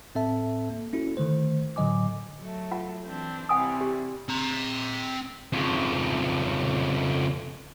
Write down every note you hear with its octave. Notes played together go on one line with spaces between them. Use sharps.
A2 C4 A4 E5 A5
A#3
C#4 E4 F#4 A4
D3 D#3 A3 C5
A2 D3 F#3 D#5 G#5 D6
F#3 A3
F4 F#5
E3 C4 D4
C3 E3 G3 F#5 G#5 D#6
G4
C4 A#5
F2 C#3